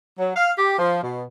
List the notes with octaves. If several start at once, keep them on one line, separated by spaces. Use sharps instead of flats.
F#3
F5
G4
F3
B2